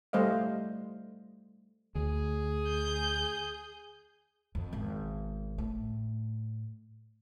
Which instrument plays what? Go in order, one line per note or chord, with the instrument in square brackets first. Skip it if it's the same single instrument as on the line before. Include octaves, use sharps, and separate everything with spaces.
[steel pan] G3 A3 C5 D#5 F5
[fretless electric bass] D2 [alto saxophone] G#4
[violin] G6
[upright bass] F2
G#1 B2
A2